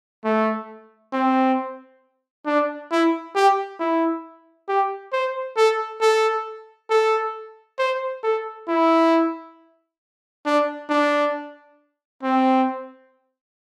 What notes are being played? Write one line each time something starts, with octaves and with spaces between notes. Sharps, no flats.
A3
C4
D4
E4
G4
E4
G4
C5
A4
A4
A4
C5
A4
E4
D4
D4
C4